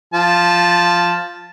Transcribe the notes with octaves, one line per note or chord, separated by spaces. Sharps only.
F3 A5